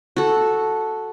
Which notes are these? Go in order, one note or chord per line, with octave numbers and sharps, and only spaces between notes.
F#4 A4